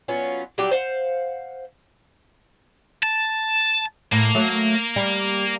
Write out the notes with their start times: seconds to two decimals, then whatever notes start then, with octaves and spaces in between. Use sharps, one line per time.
0.08 F#3 B3 C#4 F4
0.58 F#3 G3 G4 D5
0.71 C5 F5 F#5
3.03 A5
4.12 A2 A#3
4.35 F#3 A3
4.96 G3